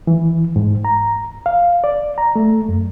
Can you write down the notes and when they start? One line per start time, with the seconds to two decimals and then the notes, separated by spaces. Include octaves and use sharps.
0.07 E3
0.56 G#2
0.85 A#5
1.46 F5
1.84 D5
2.18 A#5
2.36 A3
2.69 F#2